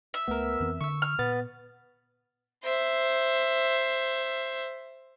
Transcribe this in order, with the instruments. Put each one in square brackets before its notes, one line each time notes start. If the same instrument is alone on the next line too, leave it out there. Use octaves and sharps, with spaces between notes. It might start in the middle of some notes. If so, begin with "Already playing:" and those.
[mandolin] E5
[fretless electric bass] C#2 A3 [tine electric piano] B3 A#4
[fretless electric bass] F2 E3 C4
[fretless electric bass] D3 [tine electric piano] C#6 E6
[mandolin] F6
[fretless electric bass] A#2 [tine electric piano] B3 A6
[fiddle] C5 E5